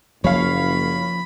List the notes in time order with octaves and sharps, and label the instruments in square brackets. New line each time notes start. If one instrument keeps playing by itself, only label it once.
[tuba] F#1 [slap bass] F3 A#3 C#4 [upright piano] C#5 F5 [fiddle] B5